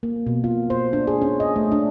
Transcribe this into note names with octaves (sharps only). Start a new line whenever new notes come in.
A#3
B2
F4
C5
D4
G#4
C#4
D#5
A3
D4